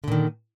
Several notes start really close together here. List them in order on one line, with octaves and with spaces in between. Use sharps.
D3 A#2 D#3